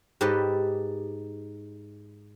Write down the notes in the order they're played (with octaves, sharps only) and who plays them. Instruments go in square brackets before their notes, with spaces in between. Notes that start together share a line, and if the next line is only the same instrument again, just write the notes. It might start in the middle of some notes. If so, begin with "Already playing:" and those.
[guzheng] G#2 G4 A4 B4 D#5